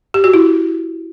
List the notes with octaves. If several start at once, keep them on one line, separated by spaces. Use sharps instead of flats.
G4
F#4
E4